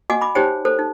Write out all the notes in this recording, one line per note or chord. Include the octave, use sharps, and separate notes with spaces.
F#4 D#5 F#5 G#5 D6
B5 D6
D#4 G4 C5 C#5 G5
A4 C5
D#4